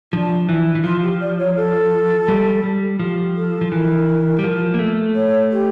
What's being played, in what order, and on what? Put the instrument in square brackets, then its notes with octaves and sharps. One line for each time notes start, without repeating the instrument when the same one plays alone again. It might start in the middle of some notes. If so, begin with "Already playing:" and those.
[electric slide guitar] F3 [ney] D4 E4
[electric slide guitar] E3 [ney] E4
[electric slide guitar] E3
[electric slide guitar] F3 [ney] F4
[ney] G4
D5
C#5
A4
[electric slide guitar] G3
G3
[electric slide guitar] F3 [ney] G4
[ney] A4
[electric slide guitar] F3
[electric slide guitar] E3 [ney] A#4
[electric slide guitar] G3
F3
A#3
A3
[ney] C#5
G4